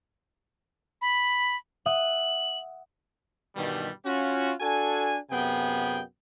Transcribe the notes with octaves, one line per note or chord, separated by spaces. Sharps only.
B5
E5 F#5 D#6 F#7
G2 B2 D#3 E3 G3
C#4 F4 F#4
D4 F#4 A4 G#5
F#2 C3 B3 G#4 G5